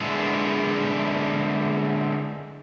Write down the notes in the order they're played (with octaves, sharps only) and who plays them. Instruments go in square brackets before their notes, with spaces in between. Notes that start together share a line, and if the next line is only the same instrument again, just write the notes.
[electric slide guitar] D3 G#3 B3 D4 E4 G#4